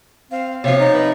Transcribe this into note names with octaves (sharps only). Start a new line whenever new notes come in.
C4 F5
C3 F3 C#5 F5
D#4
B4